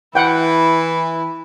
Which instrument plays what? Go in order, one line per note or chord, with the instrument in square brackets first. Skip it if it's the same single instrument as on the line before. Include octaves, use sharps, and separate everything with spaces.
[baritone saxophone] E3 [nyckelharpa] E4 [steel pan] F#5 G5